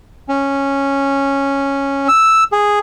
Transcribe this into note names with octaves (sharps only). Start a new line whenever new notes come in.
C#4
E6
G#4